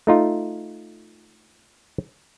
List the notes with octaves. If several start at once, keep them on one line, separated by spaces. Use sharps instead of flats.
A3 D#4 F4